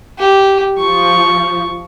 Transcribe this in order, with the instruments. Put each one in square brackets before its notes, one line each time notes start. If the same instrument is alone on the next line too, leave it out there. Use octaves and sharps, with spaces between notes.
[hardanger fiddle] G4
[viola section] F3 [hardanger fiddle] C#6